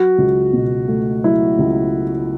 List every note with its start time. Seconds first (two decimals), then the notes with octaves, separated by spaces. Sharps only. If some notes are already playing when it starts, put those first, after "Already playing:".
Already playing: F#3 F#4
0.18 C#2
0.53 B2
0.88 A3
1.24 F#3 E4
1.59 C#2